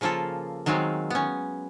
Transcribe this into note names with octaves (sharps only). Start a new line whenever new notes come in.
C#3 F3 A#3 F4 A4
D#3 F#3 G#3 C4 F4
B3 C#4